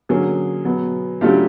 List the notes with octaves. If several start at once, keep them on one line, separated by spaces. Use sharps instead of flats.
D3 F#3 A#3 C#4 G#4
B2 F#3 B3
C#3 F#3 A3 D4 F4 G4